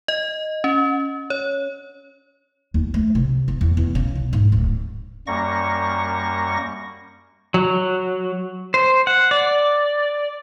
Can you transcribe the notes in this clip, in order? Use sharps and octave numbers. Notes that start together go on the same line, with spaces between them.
D#5
C#4
C#5
D#2
A3
C3
B3
E2
E2
C#3
B1
G#2
D1
F#2 G3 A#3 C#6 A#6
F#3
C5
F#5
D5